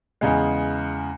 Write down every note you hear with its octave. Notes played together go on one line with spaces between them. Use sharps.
E2 C#3 G#3